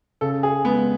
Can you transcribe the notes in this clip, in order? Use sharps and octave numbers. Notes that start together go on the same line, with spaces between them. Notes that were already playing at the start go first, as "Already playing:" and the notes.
C#3 A4
G#4
G#3 B3